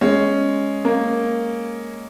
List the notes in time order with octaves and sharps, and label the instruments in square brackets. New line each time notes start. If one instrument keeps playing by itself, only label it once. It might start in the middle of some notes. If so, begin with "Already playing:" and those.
[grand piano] G#3 C#4
[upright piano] A#3